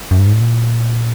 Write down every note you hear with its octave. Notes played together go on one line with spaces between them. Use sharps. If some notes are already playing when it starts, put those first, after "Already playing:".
F#2
G2
G#2
A2
A#2